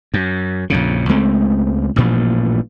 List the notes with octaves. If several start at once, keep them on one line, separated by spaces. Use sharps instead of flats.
F#2
A#1 F2 C#3
C#2 G#3 A3 C4
A1 G2 A#2 F3